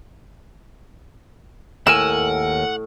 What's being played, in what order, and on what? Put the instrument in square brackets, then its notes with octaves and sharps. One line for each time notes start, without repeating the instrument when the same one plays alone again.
[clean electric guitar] D#2 A#4 G#5 [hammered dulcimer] A2 [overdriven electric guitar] F#5 [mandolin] E6